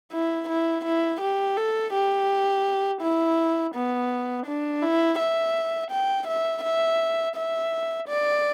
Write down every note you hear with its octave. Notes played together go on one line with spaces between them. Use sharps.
E4
E4
E4
G4
A4
G4
E4
B3
D4
E4
E5
G5
E5
E5
E5
D5